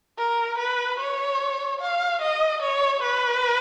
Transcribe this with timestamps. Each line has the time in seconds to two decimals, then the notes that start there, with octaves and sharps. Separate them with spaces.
0.18 A#4
0.58 B4
1.00 C#5
1.81 F5
2.22 D#5
2.62 C#5
3.03 B4